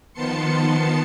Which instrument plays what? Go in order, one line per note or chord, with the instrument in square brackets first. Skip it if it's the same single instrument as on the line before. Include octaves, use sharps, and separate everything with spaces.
[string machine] D#3 F3 B3 A5 C6 C#7